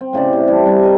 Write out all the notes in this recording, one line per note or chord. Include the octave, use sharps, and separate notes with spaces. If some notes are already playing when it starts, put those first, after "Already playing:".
C4
A2 C#3 C5 D5
C3
E3 G3 D4 G4
C3 G3 D4 G#5
A#4 D#5